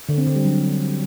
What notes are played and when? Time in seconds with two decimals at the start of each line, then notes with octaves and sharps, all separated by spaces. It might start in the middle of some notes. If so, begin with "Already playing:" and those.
0.09 D3
0.18 C4
0.27 D3
0.36 G3
0.45 F#3